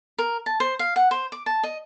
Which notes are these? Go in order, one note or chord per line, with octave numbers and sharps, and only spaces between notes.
A#4
A5
C5
F5
F#5
C5
D6
A5
D#5